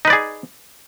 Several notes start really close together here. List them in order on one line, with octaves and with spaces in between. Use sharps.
D#4 B4 D5 G#4